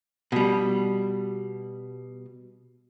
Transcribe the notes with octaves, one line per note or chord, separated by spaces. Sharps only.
B2 G3